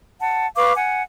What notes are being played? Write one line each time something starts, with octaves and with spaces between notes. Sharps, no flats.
F#5 A5
B4 F5 C#6 D6
F#5 G#5